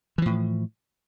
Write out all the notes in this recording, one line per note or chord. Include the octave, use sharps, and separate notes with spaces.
A2 E3 F3